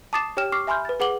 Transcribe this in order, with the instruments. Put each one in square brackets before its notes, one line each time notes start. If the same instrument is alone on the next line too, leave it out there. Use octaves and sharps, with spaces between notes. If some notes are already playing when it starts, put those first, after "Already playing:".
[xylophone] A5 D6 D#6 A6 C7 E7
G4 C#5 G5 F6 E7
C#6 D6 F6 C7
E5 G#5 B5 C6 F6 G6
B4 A6
G#4 B4 F#5 D6 F#7 G7